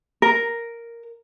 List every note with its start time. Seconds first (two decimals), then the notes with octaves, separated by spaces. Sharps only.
0.22 A#4